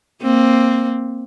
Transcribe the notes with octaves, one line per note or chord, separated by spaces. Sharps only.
A#3 C4